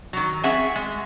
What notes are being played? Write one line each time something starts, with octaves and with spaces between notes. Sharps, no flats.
D#3 F#3
C4 C#4 G#4 C#5 E5 F#5
G#3